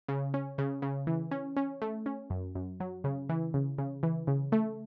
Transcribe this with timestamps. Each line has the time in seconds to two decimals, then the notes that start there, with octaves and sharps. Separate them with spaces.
0.09 C#3
0.34 C#4
0.58 C#3
0.82 C#3
1.07 E3
1.31 C#4
1.57 C#4
1.82 A3
2.06 C#4
2.30 F#2
2.55 F#2
2.80 F#3
3.04 C#3
3.29 E3
3.54 C#3
3.78 C#3
4.03 E3
4.27 C#3
4.52 A3